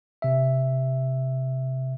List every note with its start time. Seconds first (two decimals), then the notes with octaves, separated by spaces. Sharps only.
0.22 C3 E5